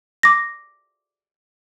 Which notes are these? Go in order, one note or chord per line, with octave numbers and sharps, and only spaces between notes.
D6 A#6